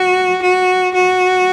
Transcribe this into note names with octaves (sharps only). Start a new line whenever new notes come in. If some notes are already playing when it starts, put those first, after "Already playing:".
Already playing: F#4
F#4
F#4